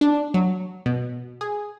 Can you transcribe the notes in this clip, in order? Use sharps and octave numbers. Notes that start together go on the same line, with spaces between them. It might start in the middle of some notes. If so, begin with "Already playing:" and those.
D4
F#3
B2
G#4